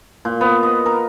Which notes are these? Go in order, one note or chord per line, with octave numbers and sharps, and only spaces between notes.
A#2
B3
D#5
A#4